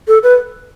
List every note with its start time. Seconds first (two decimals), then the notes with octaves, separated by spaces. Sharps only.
0.08 A4
0.23 B4